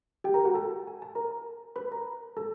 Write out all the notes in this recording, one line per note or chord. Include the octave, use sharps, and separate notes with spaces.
G4 G5
A#4 A#5
F#4 F#5
A4 A5
G#5
A5
A#4 A#5
B4 B5
A#4 A#5
A4 A5